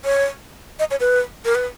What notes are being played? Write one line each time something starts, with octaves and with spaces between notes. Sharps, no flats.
C#5
D#5
C#5
B4
A#4
B4